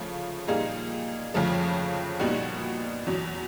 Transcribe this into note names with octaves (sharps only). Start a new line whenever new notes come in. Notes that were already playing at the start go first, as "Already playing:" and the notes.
Already playing: C#3 F3 A3
A#2 G3 A#3 D#4 G#4
F2 C#3 F3 A3
A#2 G3 B3 D#4 F#4
E2 B2 F#3